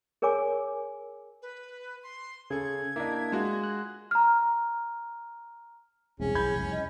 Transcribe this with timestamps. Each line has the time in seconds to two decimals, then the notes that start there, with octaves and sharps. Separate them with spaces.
0.22 G#4 A#4 C#5 G#5 D6
1.42 B4
2.03 C6
2.50 C#3 G#4 A4 G#6
2.96 A#3 D4 E4 D#5
3.32 G#3 F4 F#4
3.63 F#6
4.11 A#5 F6
6.20 E1 C2 C3 C#4 G#4
6.35 B1 E3 B5 G6 G#6
6.56 F1 C2
6.72 D#5